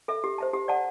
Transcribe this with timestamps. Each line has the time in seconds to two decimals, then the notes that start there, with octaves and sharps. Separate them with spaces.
0.08 A4 E5
0.24 G4
0.38 C5 E5 A5
0.54 G4
0.68 D5 F#5 A5